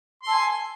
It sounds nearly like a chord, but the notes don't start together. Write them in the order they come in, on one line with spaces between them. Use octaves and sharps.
C6 A4 G#5